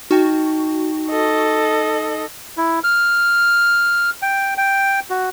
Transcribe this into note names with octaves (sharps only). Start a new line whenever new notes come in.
D#4 F#4 G5
A4 D#5
E4
F6
G5
G5
F#4